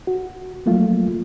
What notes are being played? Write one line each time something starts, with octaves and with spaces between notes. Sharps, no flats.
F#4
F3 F#3 A3 A#3 F4